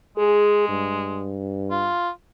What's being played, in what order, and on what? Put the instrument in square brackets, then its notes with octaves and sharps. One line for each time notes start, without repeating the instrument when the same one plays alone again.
[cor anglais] G#3 [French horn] G#4
[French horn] G2
[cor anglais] F4